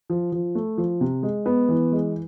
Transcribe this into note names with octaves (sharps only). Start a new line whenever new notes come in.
F3
F3
A3
F3
C3
G#3
B3
E3
G#3